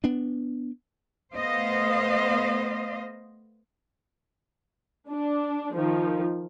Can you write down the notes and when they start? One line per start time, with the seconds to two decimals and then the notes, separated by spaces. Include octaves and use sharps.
0.04 B3 D4
1.34 A3 B3 C5 D#5 F5
5.10 D4
5.75 D#3 F3